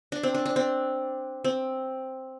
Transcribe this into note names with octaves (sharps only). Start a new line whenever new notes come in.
D4
C4
D4
D4
C4
C4